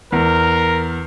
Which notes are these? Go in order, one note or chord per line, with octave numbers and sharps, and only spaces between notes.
E2 A#4